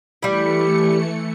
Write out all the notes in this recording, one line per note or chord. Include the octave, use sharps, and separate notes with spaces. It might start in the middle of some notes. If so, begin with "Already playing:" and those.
E3 G3 A3 E4 C#7